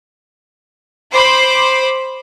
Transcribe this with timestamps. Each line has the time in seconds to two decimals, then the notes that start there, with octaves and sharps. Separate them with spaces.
1.12 C5 B5 D6